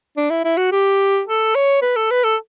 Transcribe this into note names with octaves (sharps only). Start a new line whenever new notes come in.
D4
E4
E4
F#4
G4
A4
C#5
B4
A4
B4
A4